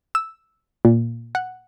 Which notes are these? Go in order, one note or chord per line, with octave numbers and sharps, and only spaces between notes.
E6
A#2
F#5